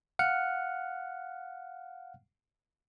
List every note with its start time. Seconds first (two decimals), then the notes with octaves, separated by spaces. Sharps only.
0.19 F5 F#5 F6 F#6 C#7